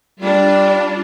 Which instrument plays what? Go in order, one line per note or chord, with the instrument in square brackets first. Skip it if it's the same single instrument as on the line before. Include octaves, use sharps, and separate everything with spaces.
[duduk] G3 [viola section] D4 F4